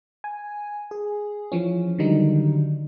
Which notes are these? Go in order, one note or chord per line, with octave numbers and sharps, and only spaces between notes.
G#5
G#4
E3 F3 C#4
D3 D#3 F#3 G3 D#4